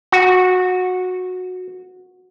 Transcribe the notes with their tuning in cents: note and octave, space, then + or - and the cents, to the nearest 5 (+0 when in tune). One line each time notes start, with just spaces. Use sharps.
F#4 -15